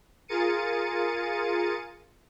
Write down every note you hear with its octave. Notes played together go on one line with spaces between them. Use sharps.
F4 G#4 A#4 A6 C#7 D#7